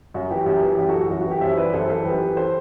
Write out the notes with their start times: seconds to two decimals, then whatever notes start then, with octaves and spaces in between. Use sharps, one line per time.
0.14 F#2 F#4
0.31 E3 G4
0.46 F#2 G4
0.63 E3
0.78 F#2 G4
0.89 F#4 A4
0.94 E3
1.00 F#4
1.10 F#2 F#4
1.21 E3 F#4
1.31 G4
1.41 F#2 C5 E5
1.57 E3 B4 D5
1.73 F#2 A4 C5
1.89 E3 A4 C5
2.05 F#2 G4 B4
2.21 E3
2.37 A4 C5